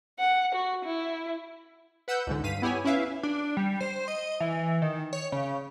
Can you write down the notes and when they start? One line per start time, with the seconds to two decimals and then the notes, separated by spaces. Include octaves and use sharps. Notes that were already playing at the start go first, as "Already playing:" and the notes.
0.19 F#5
0.55 F#4
0.85 E4
2.08 B4 F#5 E6 F#6 G6
2.27 C#2 G#2 D3
2.43 G2 F5 B6 D#7
2.62 B3 E4 G4 C#5 G#5
2.85 C#4 E4 B4 E5 F5
3.23 D4
3.57 G3
3.81 C5
4.08 D#5
4.40 E3
4.82 D#3
5.13 C#5
5.32 C#3